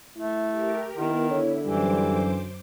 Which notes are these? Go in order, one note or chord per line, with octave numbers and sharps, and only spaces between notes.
A3 E4
G4 A#4
D#3 B3 E4 A#4
D3 E4 C#5
F#2 E3 G3 C5 D6